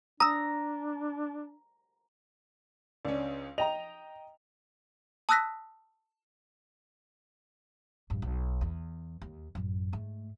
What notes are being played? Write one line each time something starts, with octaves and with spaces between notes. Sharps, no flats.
D4 A#5 D#6 E6
C#2 C#4 D4
D#5 G5 A#5 F7
A5 D#6 E6 F#6 A#6 B6
A#1 G2
B1
E2
D#2
A1 F#2
G#2 A3